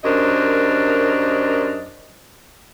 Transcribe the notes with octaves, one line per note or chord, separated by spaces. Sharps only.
F#2 D4 G4 A#4 C5 D#5